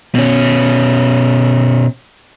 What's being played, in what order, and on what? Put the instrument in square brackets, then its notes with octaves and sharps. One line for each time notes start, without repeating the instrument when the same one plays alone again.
[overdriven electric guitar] B2 C#4